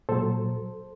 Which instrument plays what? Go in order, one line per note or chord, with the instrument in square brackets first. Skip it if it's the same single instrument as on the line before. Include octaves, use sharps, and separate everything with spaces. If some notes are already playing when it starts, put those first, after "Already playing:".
[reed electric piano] A#2 F#3 A4 C5